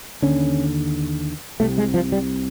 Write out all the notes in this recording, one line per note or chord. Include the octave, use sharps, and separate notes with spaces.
D#2 D3 C#4
C2 C3 A3
G#3
F3
G3